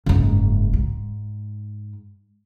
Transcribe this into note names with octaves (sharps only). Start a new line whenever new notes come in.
F#1 G#2
G#2